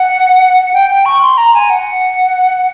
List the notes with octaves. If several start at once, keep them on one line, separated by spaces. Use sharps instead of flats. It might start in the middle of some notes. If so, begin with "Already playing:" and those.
Already playing: F#5
G5
G5
C#6
C6
A#5
G#5
F#5